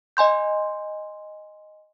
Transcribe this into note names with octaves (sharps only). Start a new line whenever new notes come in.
D#5 G#5 C6 G6